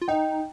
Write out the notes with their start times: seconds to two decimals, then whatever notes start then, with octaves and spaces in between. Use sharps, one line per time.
0.01 F4
0.08 D#4 D#5 G5